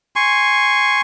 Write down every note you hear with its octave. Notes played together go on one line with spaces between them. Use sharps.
G#5 C6 C#6